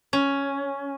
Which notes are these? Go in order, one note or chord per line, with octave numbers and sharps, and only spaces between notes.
C#4